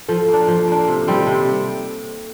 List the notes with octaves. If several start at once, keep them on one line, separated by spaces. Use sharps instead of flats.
F3 A4
A#3
D4
F3
A#3 D4
C3
D#3 G3 C4
C3